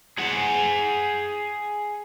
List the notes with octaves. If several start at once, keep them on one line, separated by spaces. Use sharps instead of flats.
G#4 F#5